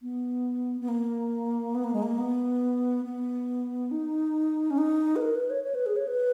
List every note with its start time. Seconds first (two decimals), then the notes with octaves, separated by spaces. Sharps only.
0.02 B3
0.81 B3
0.88 A#3
1.75 B3
1.84 A#3
1.94 G#3
2.03 A#3
2.18 B3
3.05 B3
3.91 D#4
4.71 C#4
4.78 D#4
5.16 B4
5.21 A#4
5.35 B4
5.50 C#5
5.64 C#5
5.75 B4
5.86 G#4
5.96 C#5
6.07 B4